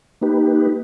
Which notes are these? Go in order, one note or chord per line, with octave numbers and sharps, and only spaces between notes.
A#3 D#4 G4 B4